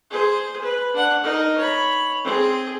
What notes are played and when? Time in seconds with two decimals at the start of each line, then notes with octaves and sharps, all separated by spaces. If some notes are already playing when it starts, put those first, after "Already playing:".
0.10 G#4 C5
0.62 B4
0.94 D4 F#5
1.23 D#4 A#4
1.58 C#5 B5
2.24 C4 G#4